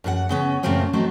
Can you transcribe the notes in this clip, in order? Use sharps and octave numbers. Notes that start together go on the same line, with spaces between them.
F#2 G#4 F#5
C#3 B3 C#4
F#2 A#2 C#3 A3 A#3 C4
F#3 A3 C4 D#4